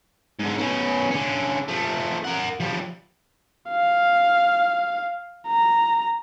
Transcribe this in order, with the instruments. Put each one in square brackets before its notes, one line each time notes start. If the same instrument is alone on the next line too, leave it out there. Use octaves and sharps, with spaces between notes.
[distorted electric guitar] G#2 D3
B2 C#4
D3 C#4
F3 A3
A#4 F#5
F3 G3
[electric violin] F5
A#5